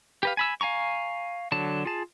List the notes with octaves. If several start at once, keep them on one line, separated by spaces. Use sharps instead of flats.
G4 B4 F5
G#5 B5 E6
F5 G#5 A#5 C#6
D3 F#3 A5
F4 G#4 A5